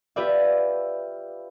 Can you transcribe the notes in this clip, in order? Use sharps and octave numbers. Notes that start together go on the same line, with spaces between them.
F4 G4 B4 D5 E5